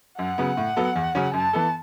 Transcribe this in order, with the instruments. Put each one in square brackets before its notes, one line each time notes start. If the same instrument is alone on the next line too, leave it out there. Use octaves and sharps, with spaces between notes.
[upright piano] F#2 [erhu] F#5
[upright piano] C#3 F#3 B3
A2
F#3 B3 A4
E2
C#3 F#3 C#4
[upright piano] F#2 [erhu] A5
[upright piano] E3 B3 A4